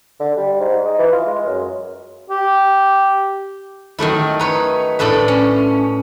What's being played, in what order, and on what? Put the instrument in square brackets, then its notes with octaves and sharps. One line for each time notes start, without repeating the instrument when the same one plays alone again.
[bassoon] D3
G3
G#2
D#4
E3
F4
G#3
F#2
[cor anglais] G4
[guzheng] D#3 F#3 A3 E4
D#4 B4 C#5
A2 D4 A4 B4 E5
C#4